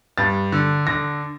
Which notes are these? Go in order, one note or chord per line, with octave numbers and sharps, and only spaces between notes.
G2 A6
D3
D3 A#6